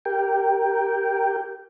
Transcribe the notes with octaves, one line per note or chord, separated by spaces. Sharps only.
G4 A#4 G5